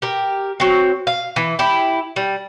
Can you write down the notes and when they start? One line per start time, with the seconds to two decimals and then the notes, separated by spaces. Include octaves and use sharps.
0.02 G4 A#4
0.60 F#3 C4
1.07 F5
1.36 E3
1.59 E4 G4
2.16 G3